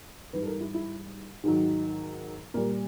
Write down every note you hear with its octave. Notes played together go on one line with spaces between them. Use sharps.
G#2 E3 G3 B4
A4
A#4
E4
E4
G#2 D#3 F#3
A#2 G3 A#4